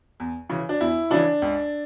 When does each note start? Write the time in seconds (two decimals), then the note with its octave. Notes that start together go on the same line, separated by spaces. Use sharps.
0.20 E2
0.49 C#3 E3
0.69 D4
0.80 E2 E4
1.10 C#3 E3 D4
1.42 C#2